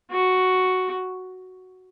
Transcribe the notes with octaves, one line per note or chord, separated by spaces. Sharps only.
F#4